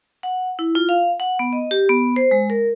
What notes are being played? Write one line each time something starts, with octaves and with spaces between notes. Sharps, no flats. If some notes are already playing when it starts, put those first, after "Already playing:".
F#5
E4
F4
F5
F#5
B3
D#5
G4
B3
C5
G#3
A#4